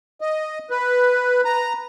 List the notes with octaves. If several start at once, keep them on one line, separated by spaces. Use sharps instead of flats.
D#5
B4
A#5